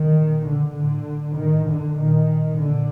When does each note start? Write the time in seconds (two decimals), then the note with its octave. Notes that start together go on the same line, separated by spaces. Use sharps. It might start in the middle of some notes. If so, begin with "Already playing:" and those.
Already playing: D#3
0.17 A#2
0.46 D3
0.77 A2 D3
1.36 A2 D#3
1.68 D3
1.97 A#2 D#3
2.57 A#2 D3